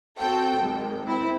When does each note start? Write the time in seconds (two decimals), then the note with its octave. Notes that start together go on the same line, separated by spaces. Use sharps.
0.19 C4 F#4 A4 G5
0.60 G#1 G#3
1.04 C4 E4